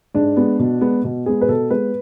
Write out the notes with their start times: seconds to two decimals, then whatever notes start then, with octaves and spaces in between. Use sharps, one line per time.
0.15 G#2 D4
0.36 G#3 B3
0.59 B2
0.81 G#3 B3
1.04 B2
1.26 G#3 B3 G#4
1.41 B4
1.49 B2 A4
1.70 G#3 B3 B4